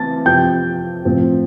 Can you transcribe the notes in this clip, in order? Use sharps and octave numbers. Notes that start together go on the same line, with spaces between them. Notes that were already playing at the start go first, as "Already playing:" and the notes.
Already playing: E3 A3 C4 A5 A6
C3 F3 C4 G5 G6
A2 F3 C4